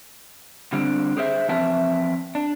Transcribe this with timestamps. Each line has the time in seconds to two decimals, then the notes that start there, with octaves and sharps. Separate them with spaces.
0.73 D3 G3 C4 D4
1.17 G4 G#4 C5 E5
1.48 E3 F3 C4 E5 A5
2.35 D4